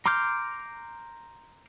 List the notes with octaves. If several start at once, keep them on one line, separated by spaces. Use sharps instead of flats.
A#5 C6 D6 F6 G6